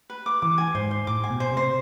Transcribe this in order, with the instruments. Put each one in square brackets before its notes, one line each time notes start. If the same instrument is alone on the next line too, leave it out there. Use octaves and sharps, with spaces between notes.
[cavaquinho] B4
D6
[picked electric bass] E3 [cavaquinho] D6
[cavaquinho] G#5
[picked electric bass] G#2 [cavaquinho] C5
[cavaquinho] C5
[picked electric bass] A2 [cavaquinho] D6
[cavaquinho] G#5
[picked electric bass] B2
[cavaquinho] C5
[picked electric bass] C3
[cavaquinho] C5